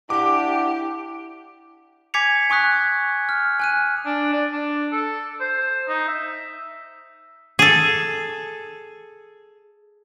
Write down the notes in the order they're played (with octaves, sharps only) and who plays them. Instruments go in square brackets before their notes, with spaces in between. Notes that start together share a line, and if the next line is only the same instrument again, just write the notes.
[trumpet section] D4 F#5 [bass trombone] E4 [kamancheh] G4 [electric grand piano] D6
[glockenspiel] G#5 D6 G#6 B6 C#7 F7
G#5 C#6 D#6 F#6 B6
F6
G#5 F#6 D#7
[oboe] D4
D5
D4
A4
C5
D#4
E5
[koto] G#4 A4